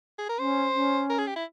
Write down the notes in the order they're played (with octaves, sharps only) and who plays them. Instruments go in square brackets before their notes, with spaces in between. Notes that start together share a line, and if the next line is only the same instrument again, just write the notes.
[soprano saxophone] G#4
A#4
[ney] C#4 [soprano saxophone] C5
[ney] C#4
[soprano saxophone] A#4
G#4
G4
E4